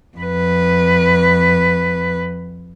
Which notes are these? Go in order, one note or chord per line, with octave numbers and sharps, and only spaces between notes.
F2 B4